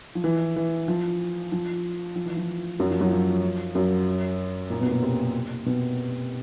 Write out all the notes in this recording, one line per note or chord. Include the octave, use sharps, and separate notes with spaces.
F3
E3
E3
F3
F3
F3
E3
F3
F#2 F#3
F3
F#2 F#3
F3
F#2 F#3
A#2 A#3
B2 B3
A#3
B2 B3
C3 C4
B2 B3